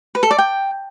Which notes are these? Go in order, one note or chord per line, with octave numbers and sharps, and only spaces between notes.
B4
A4
D5
G5